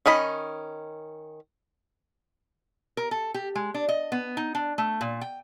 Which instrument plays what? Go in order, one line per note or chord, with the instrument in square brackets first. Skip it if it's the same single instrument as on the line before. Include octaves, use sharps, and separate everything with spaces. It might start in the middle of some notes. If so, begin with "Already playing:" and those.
[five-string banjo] D#3 C#4 D#5 B5
[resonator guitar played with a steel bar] A#4
A4
G4
G#3
D4
D#5
B3
D#4
D4
A3
A#2
G5